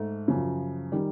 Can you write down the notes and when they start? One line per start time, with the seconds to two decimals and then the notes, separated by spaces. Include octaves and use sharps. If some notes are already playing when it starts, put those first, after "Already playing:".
Already playing: G#2 A3
0.28 F#2 C#3 F3
0.92 D#3 G3